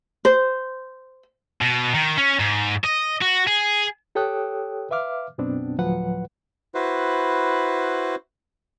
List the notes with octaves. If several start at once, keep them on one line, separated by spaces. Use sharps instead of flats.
C5
B2
D#3
C#4
G#2
D#5
F#4
G#4
G4 A4 C#5 G5 D#6 F#6
B4 E5 F5 D6 F6
F#2 B2 B3 C4 D4
D2 A2 F3 F#3 B4 F#5
E4 F#4 B4 C5